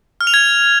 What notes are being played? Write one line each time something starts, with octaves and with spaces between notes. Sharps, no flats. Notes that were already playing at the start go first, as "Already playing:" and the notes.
F6
F7
G#6